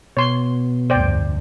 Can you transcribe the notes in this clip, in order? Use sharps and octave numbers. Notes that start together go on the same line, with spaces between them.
B2 C#5 C6
F1 D2 G2 C5 D5 G5